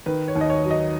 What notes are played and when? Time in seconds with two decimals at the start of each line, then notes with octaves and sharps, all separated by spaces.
0.06 D#3 B4
0.28 C#5
0.35 D#2
0.41 D#5
0.50 C#5
0.64 F#3
0.71 D#5